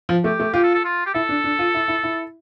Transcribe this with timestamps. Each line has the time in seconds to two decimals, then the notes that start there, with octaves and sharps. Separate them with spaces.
0.09 F3
0.24 A3 G4
0.40 A3
0.54 F4 G4
0.63 A4
0.74 A4
0.85 F4
1.06 G4
1.14 E4 A4
1.29 D4
1.44 D4
1.59 F4
1.74 E4
1.88 E4
2.03 E4